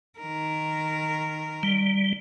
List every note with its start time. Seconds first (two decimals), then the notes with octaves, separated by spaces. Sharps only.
0.19 D#3 A#4
1.63 G3